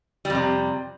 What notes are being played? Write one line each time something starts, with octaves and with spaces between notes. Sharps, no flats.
F2 C3 G3